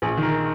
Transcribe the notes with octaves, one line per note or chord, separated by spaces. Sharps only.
A#1 G#4
D#3
A#4